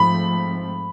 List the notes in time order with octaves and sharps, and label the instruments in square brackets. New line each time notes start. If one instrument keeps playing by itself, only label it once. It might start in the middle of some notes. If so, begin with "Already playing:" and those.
Already playing: [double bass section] G#2 F3 A3 C4 [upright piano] B5